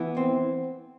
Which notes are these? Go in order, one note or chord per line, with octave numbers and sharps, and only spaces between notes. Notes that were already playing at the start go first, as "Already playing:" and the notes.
Already playing: E3 B3
C4